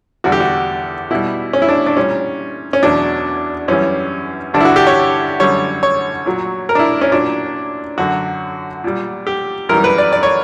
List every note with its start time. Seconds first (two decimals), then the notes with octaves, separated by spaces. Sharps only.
0.24 E2 D3 G3 F#4
0.32 G4
0.40 F#4
1.11 B2 G3 E4
1.53 C#4
1.62 E4
1.69 D4
1.86 D4
1.97 A#2 G3 C#4
2.73 C#4
2.83 E2 B2 F#3 D4
3.68 F#2 E3 G3 C#4
4.54 G2 D3 G3 D4
4.60 E4
4.65 F#4
4.76 G4
4.87 C#5
5.40 F#2 D3 G3 C#5
5.83 C#5
6.26 A#2 F#3
6.69 A#4
6.75 D4
6.79 E4
7.01 C#4
7.12 A#2 F#3 D4
7.98 F#2 D3 F#3 F#4
8.84 A#2 G3
9.27 G4
9.69 F#2 E3 G3 A#4
9.84 B4
9.98 D5
10.13 D5
10.23 C#5